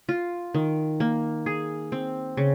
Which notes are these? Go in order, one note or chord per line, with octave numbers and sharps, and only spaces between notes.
F4
D#3
A#3
G#4
C4
C#3